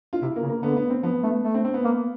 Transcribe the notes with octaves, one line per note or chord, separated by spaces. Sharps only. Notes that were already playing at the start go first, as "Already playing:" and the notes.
F4
C3 E4
A#3
C#3
A#3
D3 B3
B3
C4
F3 B3
A3 B3
A3
C4
C4
B3
A#3